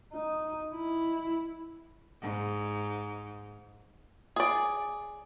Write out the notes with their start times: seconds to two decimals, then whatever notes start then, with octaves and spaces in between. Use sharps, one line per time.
0.13 D#4
0.75 E4
2.22 G#2
4.36 G#4 D5